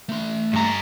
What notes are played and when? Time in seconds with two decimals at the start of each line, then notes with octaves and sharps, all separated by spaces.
0.09 A3 C6
0.53 G2 A#5